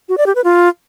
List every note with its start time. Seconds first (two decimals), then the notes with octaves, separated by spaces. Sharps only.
0.09 F#4
0.18 D5
0.26 G4
0.35 B4
0.44 F4